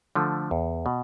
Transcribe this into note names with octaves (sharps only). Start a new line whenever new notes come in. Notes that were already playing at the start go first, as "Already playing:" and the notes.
D3 F3 A3
E2
B2